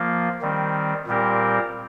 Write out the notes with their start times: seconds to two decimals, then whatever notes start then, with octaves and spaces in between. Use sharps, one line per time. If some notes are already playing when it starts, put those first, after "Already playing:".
Already playing: F3 A#3 F4
0.41 D#3 G3 C4
1.07 A#2 G3 C4 G4 A#4